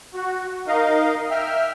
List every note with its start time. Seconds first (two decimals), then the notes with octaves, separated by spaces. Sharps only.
0.14 F#4
0.68 D#4 A#4 D#5 F5
1.30 E5 G5 F6